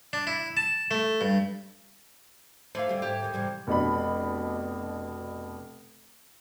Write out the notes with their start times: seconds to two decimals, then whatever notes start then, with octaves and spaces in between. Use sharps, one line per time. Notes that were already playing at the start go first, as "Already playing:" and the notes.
0.13 D4
0.27 E4
0.57 A5
0.91 A3
1.21 G2
2.75 A3 A4 C5 F5 D6 G#6
2.88 D2 G3 C4
3.02 G#2 G4 E5
3.20 D#2 D#3
3.34 C3 E3 G3
3.67 F1 B2 D4 B5